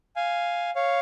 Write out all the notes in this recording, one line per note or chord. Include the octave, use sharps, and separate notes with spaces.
F5 G#5
C#5 F5